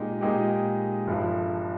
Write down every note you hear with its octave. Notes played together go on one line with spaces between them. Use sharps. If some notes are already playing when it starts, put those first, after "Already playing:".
Already playing: A#2 G#3 D#4 G4
A#2 G#3 D#4 G4
G1 G2 F3